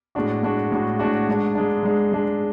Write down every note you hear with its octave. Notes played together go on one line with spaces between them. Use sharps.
A2 G#3 D4 F#4
A2 G#3 D4 F#4
A2 G#3 D4 F#4
A2 G#3 D4 F#4
G#2 G#3 D4
G#2 G#3 D4
G#2 G#3 D4
G#2 G#3 D4